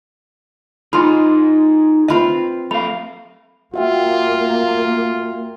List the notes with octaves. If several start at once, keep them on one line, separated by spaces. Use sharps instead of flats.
D#4 F4 G#4 B5 C6
C4 F4 B4 E5 B5
A3 F5 B5
A#3 F4 F#4 E5 G5